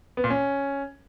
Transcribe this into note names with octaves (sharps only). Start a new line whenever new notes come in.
B3
A#2
C#4